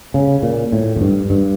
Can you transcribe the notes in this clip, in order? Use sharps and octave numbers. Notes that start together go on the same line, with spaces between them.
C#3
A#2
A2
F2
G2
G2